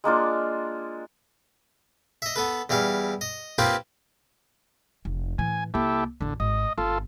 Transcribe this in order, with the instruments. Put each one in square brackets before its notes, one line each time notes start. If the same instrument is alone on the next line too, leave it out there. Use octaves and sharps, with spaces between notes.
[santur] G#3 A#3 D4 F4
[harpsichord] D#5 E5
B3 A4 B4
E2 E3 G3 F5
D#5
A#3 C4 D#4 F4 G4 B4
[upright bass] F1
[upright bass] A2 E3 [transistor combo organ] G#5
[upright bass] C2 A#3 [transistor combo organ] E4 G4 A4
[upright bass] A1 E2 [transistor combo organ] D3
[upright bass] G#1 [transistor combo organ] D#5
[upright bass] G1 [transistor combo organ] F4 A4